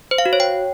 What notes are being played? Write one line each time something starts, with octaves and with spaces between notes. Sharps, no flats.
C5
F5
F#4
C#5
G5